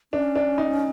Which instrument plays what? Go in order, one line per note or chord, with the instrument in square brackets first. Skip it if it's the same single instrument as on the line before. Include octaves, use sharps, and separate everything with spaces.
[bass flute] C#4 [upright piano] D4
[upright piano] D4
D#4